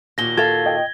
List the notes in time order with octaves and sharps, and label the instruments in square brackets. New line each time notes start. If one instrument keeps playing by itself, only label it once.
[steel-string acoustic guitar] D#2 A#2 F#4 [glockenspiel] A#6 G7
[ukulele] A4 F5 [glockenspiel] G#6
[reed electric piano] D#5 G5